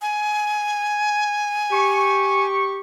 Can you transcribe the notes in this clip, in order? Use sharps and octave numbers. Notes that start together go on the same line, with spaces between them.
G#5
G4 C#6